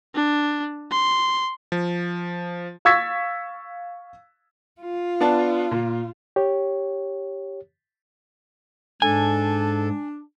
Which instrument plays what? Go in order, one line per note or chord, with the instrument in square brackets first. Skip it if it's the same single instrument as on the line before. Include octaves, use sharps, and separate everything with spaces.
[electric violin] D4
C6
[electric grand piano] F3
[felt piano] F5 C#6 E6 G#6 A6 B6
[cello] F4
[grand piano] B3 D4 A5
A#2
[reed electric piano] G4 C#5
[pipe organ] G#2 [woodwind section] D4 [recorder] A4 [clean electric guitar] G#5